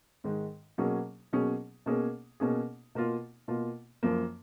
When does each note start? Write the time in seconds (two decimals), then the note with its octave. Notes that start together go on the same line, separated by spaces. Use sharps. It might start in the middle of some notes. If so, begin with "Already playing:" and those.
0.24 G#2 D#3 G#3
0.78 B2 F#3 A#3 C#4 G#4
1.33 B2 F#3 A#3 C#4 G#4
1.86 B2 A#3 C#4 G#4
2.40 B2 A#3 C#4 G#4
2.95 B2 A#3 F4
3.48 B2 A#3 F4
4.03 F#2 F3 A#3